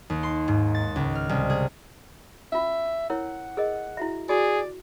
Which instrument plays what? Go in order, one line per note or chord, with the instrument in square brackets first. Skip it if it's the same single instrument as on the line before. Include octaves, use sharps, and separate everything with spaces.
[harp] D#2
C6
G#2
A6
C#2
F6
C2
G#4
[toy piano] C#4 F4 [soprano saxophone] E5
[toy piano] E4 A#4 C#5 [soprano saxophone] F#5
[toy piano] G#4 A#4 D#5
E4 F#4 E5
[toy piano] F#4 [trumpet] G#4 [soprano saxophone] D5